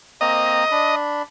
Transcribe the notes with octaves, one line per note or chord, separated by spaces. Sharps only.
A#3 C4 D#5 A#5
D4 B5